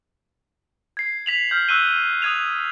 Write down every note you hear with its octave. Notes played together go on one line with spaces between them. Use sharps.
G#6 C7
B6 F7 F#7
F6 G6 F7 F#7
C#6 E6 F#6 B6 D#7 G7
D#6 F#6 G#6 D#7 F7